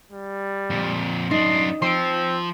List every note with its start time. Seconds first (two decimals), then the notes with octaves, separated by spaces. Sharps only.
0.11 G3
0.70 F2 A#2
1.31 F#2 D4 D#4 C6
1.82 F3 C4 C6 D7